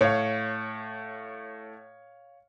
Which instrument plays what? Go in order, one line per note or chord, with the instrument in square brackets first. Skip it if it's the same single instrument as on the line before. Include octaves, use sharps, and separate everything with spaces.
[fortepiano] A2 [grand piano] C#5 F5